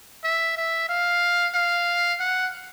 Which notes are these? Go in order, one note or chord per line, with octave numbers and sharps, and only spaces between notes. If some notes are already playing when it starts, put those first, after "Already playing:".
E5
E5
F5
F5
F#5